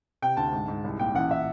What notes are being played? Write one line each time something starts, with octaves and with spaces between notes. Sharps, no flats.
C3 G5
D2 A5
G#2
G#2
C2
A#2 G5
A1 F#5
E5